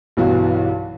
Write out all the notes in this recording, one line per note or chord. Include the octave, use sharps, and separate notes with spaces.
B1 G2 E3 F#4 F5